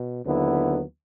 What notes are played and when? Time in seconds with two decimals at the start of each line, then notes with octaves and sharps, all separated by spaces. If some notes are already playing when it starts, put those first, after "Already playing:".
Already playing: B2
0.25 D#2 D3 F#3 B3 E4